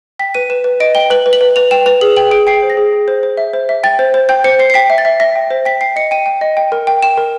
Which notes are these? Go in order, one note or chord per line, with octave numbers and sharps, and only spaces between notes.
G5 B6
B4 D#7
B4 E7
B4
D#5 D7
G5 G7
B4 F#7
B4
F#7
B4
B4 F7
G5 E7
B4 F7
G#4 F#7
G5 F#7
G#4 D7
G5 C7
C5
A#6
G#4
G#4
C5
C5
E5
C5
E5
G5 A6
C5
C5
G5 G6
C5 C#7
C5 C7
C7
G5 B6
E5
A6
E5
E5 A#6
G5
C5
G5 B6
G5 C7
D#5 C#7
G5 D#7
G5
D#5
G5
A#4
G5
G5 E7
A#4